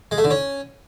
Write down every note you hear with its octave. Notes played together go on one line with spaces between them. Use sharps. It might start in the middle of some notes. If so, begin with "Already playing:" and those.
G#3
A3
D3
C#4